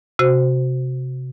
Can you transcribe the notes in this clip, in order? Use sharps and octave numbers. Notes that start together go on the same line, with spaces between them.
C3 F#4 C5